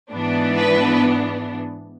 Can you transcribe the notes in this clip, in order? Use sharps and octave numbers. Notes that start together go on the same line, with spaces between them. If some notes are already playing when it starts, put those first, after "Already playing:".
G#2 E3 B3 D4
B4